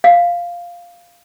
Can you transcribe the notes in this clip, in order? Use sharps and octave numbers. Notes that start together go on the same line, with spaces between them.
F5